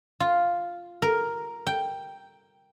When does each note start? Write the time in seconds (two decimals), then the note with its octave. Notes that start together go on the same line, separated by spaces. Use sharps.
0.20 F4
1.02 A#4
1.67 G5